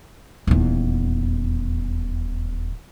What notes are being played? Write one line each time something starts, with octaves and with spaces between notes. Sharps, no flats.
D#1 E2